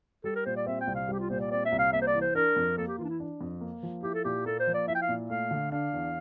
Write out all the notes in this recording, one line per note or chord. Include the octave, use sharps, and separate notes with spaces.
G3 A4
A#4
A#2 C5
D5
C4 E5
G5
C2
F5
G3 G4
F4
A#2 C5
D5
C4 D5
E5
C2
F5
A#3 E5
C5
D5
E3
C5
D4 A#4
F2
A#3 A4
G4
E3 F4
D4
E4
D4
F2
A#3
F3
E4 G4
A4
A#2 G4
A#3 A4
C5
F3
D5
E4 E5
G5
F5
A#2
A3 F5
D3
D4 F5
E2